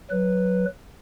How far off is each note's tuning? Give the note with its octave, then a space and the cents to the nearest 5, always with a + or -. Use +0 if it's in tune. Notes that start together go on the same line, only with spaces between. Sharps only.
F#3 +0 B4 +0